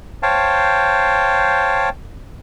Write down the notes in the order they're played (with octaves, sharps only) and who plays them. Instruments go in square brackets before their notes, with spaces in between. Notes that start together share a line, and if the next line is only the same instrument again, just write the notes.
[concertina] C5 C#5 F5 G5 A5